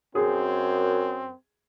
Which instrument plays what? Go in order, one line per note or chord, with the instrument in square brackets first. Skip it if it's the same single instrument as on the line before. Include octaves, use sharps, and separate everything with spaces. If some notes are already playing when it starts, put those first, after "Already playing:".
[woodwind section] F#2 [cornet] C4 [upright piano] G#4